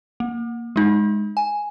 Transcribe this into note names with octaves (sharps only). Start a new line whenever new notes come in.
A#3
G#3 D#4
G#5